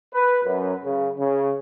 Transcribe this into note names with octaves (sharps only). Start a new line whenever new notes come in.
B4
F#2
C#3
C#3